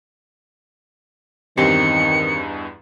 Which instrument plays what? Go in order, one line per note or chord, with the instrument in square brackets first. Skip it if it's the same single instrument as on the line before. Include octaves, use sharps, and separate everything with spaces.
[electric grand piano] E2 G2 D#4 [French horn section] D#3 [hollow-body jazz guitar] C4 G4 C5 [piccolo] C#7